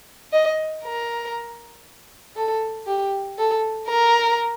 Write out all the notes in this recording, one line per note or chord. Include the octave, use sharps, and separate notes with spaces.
D#5
A#4
A4
G4
A4
A#4